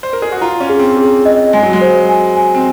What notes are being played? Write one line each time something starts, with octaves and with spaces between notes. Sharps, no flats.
C5
A#4
G#4
F#4
F4 A#5
C#4
G#4
C4
G#4
D#5
G#3 G#5
F#3
G#3
C5
G#5
G#5
C4